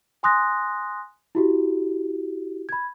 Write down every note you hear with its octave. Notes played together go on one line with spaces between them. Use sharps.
G#5 C6 D#6 F#6 A#6
E4 F#4 G4
B5 G#6